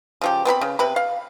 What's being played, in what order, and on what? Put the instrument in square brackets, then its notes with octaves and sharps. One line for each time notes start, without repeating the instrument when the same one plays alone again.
[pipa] C#3 F3 G4
B3 C4 A#4 B5
C#3
C3 B4 B5
F5